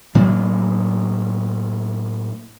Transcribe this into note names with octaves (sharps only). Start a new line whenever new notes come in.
A2 F#3 A#3 D4